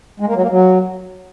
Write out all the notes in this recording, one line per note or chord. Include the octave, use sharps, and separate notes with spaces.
G#3
A#3
F#3
A#3
F#3